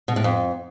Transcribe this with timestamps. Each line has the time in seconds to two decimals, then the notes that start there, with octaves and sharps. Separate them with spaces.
0.08 B2
0.16 A2
0.24 F2